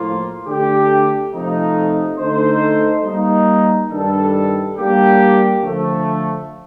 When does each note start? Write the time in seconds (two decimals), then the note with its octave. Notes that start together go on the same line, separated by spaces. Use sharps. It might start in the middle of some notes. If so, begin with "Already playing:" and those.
Already playing: A2 F3 A#3 F4
0.46 D3 A3 D4 G4
1.32 F2 C3 F3 A3 D#4
2.18 D3 A3 D#4 A4 C5
3.04 G3 A#3 D#4
3.90 G2 D#3 G3 D4 A4
4.77 G3 A#3 D4 G4
5.63 D3 F3 A3